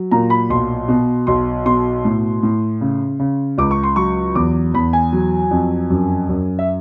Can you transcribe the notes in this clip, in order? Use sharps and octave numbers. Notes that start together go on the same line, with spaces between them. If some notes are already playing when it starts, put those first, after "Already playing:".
Already playing: F#3
A#2 A#5
B5
B1 C6
B2
B1 C6
B2 C6
A2
A2
C#3
C#3
C#2 D6
C#6
C6
F#3 C#6
E2 D6
E2 B5
G#5
F#3
F2
F#2
F#2
E5